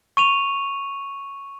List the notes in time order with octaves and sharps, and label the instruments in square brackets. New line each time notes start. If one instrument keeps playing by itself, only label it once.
[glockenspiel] C#6 D#7 F7